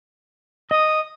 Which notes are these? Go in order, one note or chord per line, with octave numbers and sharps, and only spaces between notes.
D#5 D#6